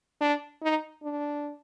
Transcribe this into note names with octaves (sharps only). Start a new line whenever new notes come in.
D4
D#4
D4